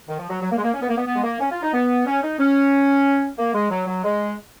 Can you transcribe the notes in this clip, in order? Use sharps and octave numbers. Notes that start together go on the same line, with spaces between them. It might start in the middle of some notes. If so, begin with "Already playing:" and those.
D#3
F3
F#3
F#3
A#3
G#3
A#3
C#4
B3
A#3
B3
B3
G#3
A#3
C#4
F4
D#4
B3
C#4
D#4
C#4
A#3
G#3
F#3
F#3
G#3